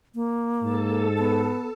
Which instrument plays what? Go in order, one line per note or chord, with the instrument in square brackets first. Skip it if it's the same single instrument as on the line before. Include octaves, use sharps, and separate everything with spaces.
[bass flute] A#3
[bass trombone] G#2 [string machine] A4 A5
[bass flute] B3